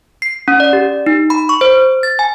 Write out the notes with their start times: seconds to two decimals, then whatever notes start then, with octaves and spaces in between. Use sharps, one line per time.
0.22 C7
0.48 C#4
0.60 D5
0.73 G4
1.06 D#4
1.30 B5
1.49 C#6
1.61 C5
2.03 A6
2.19 G#5